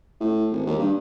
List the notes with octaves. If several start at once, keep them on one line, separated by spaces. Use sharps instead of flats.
A2
G#1
D#2
G2